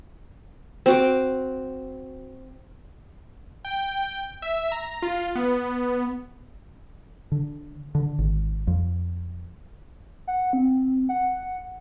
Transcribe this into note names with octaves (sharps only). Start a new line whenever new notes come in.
C4 F#4 D6
G5
E5
A#5
F4
B3
D3
D3
G#1
F2
F#5
C4
F#5